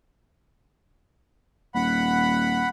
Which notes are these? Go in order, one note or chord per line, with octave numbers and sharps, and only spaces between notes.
D#1 F#5 B5